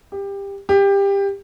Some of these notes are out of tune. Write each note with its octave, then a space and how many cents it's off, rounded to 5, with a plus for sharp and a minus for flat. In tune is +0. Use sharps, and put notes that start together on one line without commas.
G4 +20
G4 +20